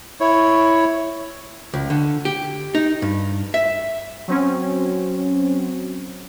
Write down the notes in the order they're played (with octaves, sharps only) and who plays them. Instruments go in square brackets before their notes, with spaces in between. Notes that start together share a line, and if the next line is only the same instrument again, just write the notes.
[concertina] E4 C#5
[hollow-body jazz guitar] C#2
D3
G4
D#4
G2
E5
[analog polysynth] F#3 C4 C#4